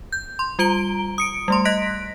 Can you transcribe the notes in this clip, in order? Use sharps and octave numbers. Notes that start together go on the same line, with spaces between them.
G6
C6
G3 F4 A#5 D7 G7
D#6 C#7 D7
G3 A3 C6
D#5 F#6 A#6 B6 D7